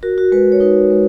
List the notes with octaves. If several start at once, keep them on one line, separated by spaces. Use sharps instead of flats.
F#4 A#4
F#4
G#3 B4
C#5
D#4 B4
G#3